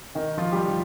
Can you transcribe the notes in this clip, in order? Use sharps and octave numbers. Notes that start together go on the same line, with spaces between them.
D#3 D#4
F3 F4
G3 G4
F3 F4